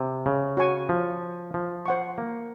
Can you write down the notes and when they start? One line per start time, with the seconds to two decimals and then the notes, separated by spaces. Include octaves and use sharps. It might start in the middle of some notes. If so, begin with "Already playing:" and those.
Already playing: C3
0.26 C#3
0.57 F#4 C#5 G#5 C#6
0.89 F3
1.54 F3
1.86 C5 F#5 C#6
2.18 A#3